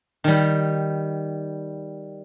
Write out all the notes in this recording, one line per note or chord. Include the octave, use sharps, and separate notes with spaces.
D#3 G3